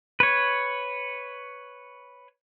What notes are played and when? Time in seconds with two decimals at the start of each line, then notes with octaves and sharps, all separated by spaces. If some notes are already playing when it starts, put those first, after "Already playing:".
0.20 B4 C#5